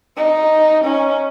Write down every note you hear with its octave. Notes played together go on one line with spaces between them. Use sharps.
D#4
C#4